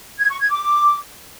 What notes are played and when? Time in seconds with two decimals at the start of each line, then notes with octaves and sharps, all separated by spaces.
0.19 G#6
0.30 C#6
0.40 G#6
0.50 D6